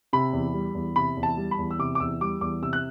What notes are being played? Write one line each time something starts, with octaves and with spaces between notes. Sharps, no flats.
C3 B5
E2
G3
E2
C3 B5
E2
A5
G3
B5
E2
E6
C3 D6
D6
E2 E6
G3 D6
E2 D6
C3 E6
F#6